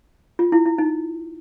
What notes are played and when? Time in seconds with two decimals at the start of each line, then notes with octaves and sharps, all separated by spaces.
0.39 F4
0.52 E4
0.66 E4
0.78 D#4